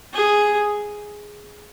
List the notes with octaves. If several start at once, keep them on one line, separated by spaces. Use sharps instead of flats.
G#4